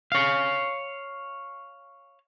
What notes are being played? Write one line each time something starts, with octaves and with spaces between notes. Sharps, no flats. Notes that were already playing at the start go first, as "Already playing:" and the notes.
C#5 F5